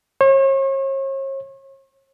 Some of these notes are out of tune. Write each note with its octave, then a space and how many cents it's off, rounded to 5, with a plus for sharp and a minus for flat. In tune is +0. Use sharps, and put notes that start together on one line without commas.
C#5 -40